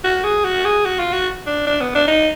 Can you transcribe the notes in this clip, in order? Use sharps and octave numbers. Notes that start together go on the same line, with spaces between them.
F#4
G#4
F#4
G#4
F#4
F4
F#4
D4
D4
B3
D4
D#4